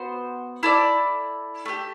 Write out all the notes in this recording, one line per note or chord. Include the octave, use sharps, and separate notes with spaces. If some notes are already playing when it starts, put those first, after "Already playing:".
Already playing: B3 F#4 C5 F#5
E4 A4 D5
A3 E4 G4